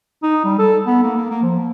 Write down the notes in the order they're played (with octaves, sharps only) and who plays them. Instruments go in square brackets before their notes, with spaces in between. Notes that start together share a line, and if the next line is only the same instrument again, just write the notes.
[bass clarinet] D#4
G3
A4
B3
A#3
A#3
A#3
F3
A#3